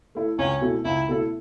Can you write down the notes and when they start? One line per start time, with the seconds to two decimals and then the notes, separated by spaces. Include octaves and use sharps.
0.15 A3 E4 A4
0.38 C#2 C#4
0.61 B2 A3 E4 A4
0.85 C#2 E4
1.08 B2 A3 E4 A4